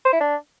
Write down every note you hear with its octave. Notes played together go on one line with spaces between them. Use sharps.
C5
E4
D4